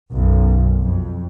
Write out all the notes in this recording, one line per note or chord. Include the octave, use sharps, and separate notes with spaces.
B1 F#2
F2